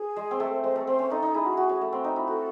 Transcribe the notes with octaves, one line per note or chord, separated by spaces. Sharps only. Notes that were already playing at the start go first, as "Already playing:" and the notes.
Already playing: G#4
G#3
C4
A3 A4
C5
G#3 C5
A3 A4
C4 C5
C#4
D#4 A4
D#4
E4 G#4
F#4
F#4
C#4
A3
C4
D#4
E4
F#4 A4